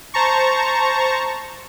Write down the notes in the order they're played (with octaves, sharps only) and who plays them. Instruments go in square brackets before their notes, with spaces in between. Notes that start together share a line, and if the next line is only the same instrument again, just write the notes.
[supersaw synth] C5 A5 A#5 C#6